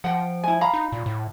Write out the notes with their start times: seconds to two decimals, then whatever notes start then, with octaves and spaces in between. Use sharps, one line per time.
0.04 F3 F#5 G5
0.44 E4 G#5
0.61 F5 A#5 B5
0.74 D#4
0.92 A#2
1.06 A2